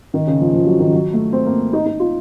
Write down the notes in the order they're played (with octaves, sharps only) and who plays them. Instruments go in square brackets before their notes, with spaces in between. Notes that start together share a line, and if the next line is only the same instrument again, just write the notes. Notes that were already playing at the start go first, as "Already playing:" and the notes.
[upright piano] D#3
C#3
F3
F3
F#3
D#3
F#3
A3
C4
A#3
D#4
D#4
F4